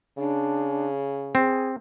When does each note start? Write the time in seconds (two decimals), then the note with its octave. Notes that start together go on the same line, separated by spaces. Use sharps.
0.18 C#3 D4
1.35 C4 G#4